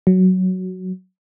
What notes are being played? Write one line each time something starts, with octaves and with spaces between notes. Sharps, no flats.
F#3